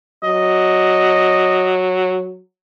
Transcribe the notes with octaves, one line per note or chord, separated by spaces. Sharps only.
F#3 D#5